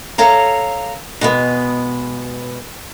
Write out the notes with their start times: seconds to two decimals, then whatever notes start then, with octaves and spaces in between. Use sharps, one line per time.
0.18 A4 C#5 F5 A#5
1.21 B2 G#3 B3